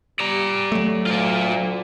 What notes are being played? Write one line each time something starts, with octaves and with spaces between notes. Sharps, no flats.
G3 D5 A#5
F#3 A3
D2 F4 D5